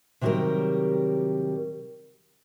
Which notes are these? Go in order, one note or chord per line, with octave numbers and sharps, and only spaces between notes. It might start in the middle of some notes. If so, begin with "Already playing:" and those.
C3 D#3 F#3 G3 G4 A#4